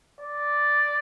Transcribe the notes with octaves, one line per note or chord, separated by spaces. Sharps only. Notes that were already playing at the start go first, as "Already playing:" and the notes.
D5